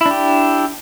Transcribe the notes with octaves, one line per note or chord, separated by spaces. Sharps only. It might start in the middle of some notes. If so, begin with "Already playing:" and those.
D4 E4 G4